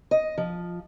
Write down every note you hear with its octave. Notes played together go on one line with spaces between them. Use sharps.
D#5
F3